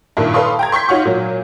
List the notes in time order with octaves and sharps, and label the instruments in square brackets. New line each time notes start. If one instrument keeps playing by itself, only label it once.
[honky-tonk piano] G2 A#2 D#3 E4
A4 B4 F5 C6 C#6 D#6
G5 A#5 G#6
C6 C#6 G6 B6
D#4 F4 C#5 F#5 C#6
A#2 F#3